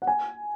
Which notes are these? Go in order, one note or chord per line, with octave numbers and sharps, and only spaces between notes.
F#5
G#5